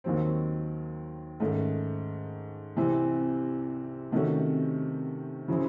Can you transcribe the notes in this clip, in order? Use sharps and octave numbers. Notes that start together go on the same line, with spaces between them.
D#2 D#3 F#3 C4
G#2 D#3 A3 C#4
C2 C3 E3 C4
C3 D#3 A3 C#4 F#4
C#3 F#3 C4 E4 G#4